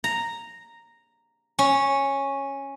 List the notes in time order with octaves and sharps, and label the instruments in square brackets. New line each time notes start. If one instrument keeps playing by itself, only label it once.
[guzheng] A#5
C#4